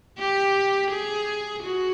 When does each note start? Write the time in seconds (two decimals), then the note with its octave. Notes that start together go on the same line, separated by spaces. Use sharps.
0.18 G4
0.91 G#4
1.63 F#4